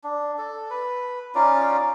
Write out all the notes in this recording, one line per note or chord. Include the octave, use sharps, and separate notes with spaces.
D4
A4
B4
C#4 D#4 F4 D5